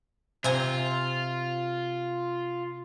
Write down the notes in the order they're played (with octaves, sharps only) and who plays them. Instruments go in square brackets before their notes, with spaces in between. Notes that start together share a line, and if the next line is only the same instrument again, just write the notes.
[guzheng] C3 G#5 A#5 [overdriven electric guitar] F4